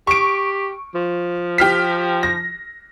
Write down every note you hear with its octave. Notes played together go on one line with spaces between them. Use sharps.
G4 C#6 D7
F3
G4 F6 B6
A#6